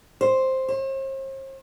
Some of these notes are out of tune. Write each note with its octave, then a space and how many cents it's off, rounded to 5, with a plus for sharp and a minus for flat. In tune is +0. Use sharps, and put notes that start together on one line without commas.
C5 +5
C5 +45